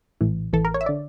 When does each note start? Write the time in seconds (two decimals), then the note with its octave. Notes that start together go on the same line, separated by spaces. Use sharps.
0.21 A#1 A2 E3
0.53 A1 A2 E3 A4
0.65 A#4
0.74 C#5
0.81 E5
0.86 D3 D5